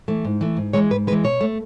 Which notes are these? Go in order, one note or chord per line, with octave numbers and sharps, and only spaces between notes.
E3 A3
G#2
E3 A3
G#2
E3 G#3 C#5
G#2 B4
E3 G#3 B4
B2 C#5
A3